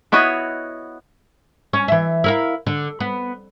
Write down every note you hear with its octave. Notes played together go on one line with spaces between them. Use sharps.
B3 E4 F#4 C#5 D#5
C#4
E3 E5
E4 A#4 F5
D3
B3